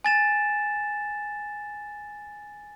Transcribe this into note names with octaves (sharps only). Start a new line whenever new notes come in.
G#5 A6 E7